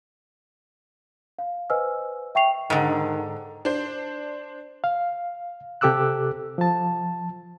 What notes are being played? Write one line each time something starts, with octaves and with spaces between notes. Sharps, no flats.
F5
B4 C5 D#5 G#5 E6 F6
E5 G5 C#6 C7 F7
G#2 D3 D#3
D4 C5
F5
C3 G4 A4 D6 E6 F#6
F3 A5